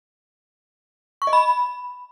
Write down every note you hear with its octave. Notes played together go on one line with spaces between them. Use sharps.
C#6
D#5
B5